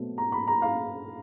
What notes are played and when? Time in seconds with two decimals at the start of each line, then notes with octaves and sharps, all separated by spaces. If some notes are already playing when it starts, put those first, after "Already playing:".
Already playing: B2 F#3 A3 C4
0.18 A#5
0.32 B5
0.47 A#5
0.62 F5